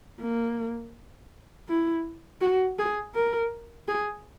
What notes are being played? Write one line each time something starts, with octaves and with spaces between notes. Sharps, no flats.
A#3
E4
F#4
G#4
A#4
G#4